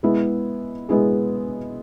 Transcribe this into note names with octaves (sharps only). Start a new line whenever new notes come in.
G#3 B3 E4 G#4
G#3 B3 E4 G#4